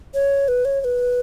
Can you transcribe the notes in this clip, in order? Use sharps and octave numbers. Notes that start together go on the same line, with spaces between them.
C#5
B4
C#5
C#5
B4